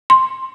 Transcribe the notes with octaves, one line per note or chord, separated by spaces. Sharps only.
C6